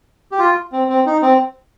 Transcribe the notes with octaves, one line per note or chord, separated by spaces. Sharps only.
G4
F4
C4
C4
D#4
C4